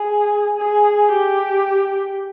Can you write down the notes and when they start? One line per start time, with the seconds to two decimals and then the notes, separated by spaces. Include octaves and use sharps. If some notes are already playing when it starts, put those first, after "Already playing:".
Already playing: G#4
0.58 G#4
1.12 G4